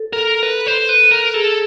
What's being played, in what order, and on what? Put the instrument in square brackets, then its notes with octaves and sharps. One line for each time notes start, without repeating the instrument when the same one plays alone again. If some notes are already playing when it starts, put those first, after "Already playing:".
Already playing: [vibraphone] A4
[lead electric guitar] A#4
B4
C5
B4
A#4
[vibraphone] G#4 [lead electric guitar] A4